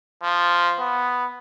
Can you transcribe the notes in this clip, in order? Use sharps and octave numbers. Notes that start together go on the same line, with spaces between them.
F3
B3